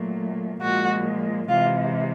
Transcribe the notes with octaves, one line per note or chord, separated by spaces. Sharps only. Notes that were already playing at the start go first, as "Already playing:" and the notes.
Already playing: A#2 F#3 A3
A#2 F3 G#3 F#4
C3 E3 G#3 F4